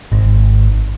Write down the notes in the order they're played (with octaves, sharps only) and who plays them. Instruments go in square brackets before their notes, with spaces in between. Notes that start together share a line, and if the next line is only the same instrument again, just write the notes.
[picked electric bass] G#1